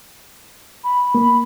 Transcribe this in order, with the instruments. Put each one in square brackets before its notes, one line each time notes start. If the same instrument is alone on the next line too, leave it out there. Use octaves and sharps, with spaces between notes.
[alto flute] B5
[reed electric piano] A#3